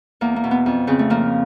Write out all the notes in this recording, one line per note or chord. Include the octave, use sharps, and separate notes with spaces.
E2 A#3
A#3
B2
B3
F2
C#3 C4
A3
F3 A#3